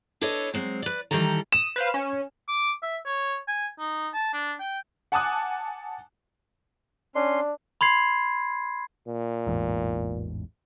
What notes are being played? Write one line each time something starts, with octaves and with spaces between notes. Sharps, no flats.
D4 A4 B4 C#5 D#5
F#3 G#3 C4
B4 D5
D#3 E3 G3 A4 A#5
D#6 E7
B4 C5 F5
C#4
D6
E5
C#5
G#5
D#4
A5
D4
G5
F#5 G#5 A5 D6 D#6 F#6
C#4 D4 C6
B5 C6 G#6 C7
A#2
A1 E2 G#2